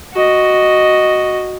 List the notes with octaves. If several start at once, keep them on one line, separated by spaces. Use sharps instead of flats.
F#4 D#5